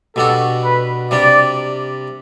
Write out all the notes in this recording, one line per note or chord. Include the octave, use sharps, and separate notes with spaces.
B2 G3 D4 F#4 A4
B4
C3 G3 D4 D5